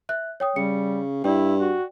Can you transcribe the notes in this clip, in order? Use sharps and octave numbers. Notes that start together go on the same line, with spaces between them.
E5 F#6
C#5 G5 D#6
C#3 G3 C#7
G2 E4 D5 G5
F#4